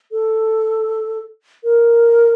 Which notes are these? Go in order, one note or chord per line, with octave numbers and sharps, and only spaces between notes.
A4
A#4